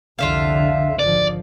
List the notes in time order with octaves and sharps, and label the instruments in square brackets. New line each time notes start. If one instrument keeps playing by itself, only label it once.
[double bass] C2 F2 [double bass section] D3 [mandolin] F4 E5 F5
[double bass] G#1 F3 [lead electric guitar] D5